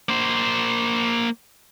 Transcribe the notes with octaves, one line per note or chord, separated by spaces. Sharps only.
A#3 C5